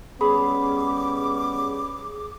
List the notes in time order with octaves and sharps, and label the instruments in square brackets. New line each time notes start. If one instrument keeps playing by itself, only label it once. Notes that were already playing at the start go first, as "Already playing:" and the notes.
[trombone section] G3 B3 C#4 [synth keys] G#4 [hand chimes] B5 [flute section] D6